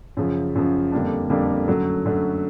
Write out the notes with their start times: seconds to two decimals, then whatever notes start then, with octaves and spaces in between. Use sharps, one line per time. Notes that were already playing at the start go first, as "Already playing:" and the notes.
0.17 F#2 C#3 F3
0.55 F#2 C#3 F3
0.92 F2 D3 G3 A#3 D4
1.30 F2 D3 G3 A#3 D4
1.68 F#2 D3 F#3 A3
2.05 F#2 D3 F#3 A3